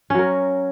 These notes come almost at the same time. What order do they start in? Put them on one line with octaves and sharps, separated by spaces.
C#4 F#3 A#4